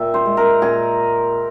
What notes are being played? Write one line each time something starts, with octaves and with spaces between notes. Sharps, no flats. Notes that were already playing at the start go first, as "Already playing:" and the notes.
Already playing: A#2 E5 G5
C5
G#3
A#4
A#2 G#4